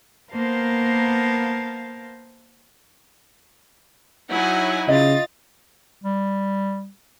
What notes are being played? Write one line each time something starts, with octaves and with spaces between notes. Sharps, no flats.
A#3 B3 A#4 C5 F5 A5
F#3 D#4 E4 F#5 G#5
C#3 F4 D#5 A6
G3